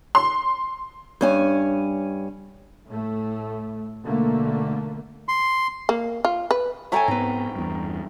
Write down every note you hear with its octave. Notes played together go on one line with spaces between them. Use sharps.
C6
G2 C#4 G#5
A2 A3
B1 D3 A3 A#3
C6
A#3
F4
B4
E4 A4 G5 G#5 A#5 C#6
G#2 B3 C4 B4
E2 G2